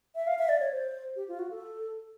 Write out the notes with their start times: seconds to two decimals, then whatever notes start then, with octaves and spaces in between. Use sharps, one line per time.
0.15 E5
0.27 F5
0.39 E5
0.49 D5
0.60 C#5
0.72 C5
1.16 G4
1.28 F4
1.39 F#4
1.51 A4